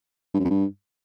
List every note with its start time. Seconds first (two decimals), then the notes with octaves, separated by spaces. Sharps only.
0.34 G2
0.40 F#2
0.45 F2
0.50 G2